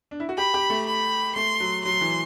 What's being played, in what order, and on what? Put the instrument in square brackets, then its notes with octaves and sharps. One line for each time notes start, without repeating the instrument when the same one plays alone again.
[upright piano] D4
E4
F#4
[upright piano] G4 [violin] B5
[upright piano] G4
A3
[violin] B5
[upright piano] A3 [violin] C6
[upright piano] F#3
[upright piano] F#3 [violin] C6
[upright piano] E3